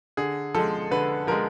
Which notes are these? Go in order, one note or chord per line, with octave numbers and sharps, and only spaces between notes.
D3 G#4
F3 G#3 A4
D3 B4
F3 G#3 A#4